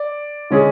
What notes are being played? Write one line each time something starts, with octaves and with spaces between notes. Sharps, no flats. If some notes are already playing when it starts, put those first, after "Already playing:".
Already playing: D5
D3 G#3 C#4 G#4